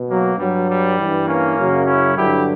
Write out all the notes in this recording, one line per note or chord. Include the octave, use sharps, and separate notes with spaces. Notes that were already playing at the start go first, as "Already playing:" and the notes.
Already playing: B2
F#3 A#3
G2 F#3 G3
G3
G2 E3
A#3 C#4
F#2 C#3 F#3
C#4 E4
G2 D3 F#3 E4 G4